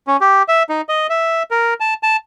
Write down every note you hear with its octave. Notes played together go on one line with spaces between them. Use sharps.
C#4
G4
E5
D#4
D#5
E5
A#4
A5
A5